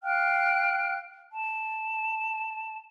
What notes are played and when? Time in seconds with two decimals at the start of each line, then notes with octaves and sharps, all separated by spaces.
0.03 F5 G5 F6 F#6
1.30 A5